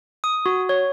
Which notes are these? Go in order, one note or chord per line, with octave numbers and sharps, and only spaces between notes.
D#6
F#4
C#5